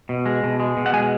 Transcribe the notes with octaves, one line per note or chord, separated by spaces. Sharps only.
B2
G#3
B2
G#3
B2
F#5
G#3 G#5